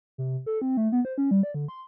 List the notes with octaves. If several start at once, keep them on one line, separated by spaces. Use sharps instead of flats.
C3
A4
C4
A3
B3
C5
C#4
G3
D5
D3
C6